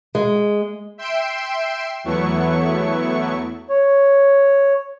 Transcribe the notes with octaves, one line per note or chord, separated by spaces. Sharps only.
G#3
E5 G5 C6 C7 D7 E7
E2 F#3 A3 B3 E4 C#6
C#5